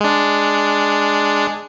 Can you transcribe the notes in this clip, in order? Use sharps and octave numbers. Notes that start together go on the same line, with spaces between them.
G#3 D4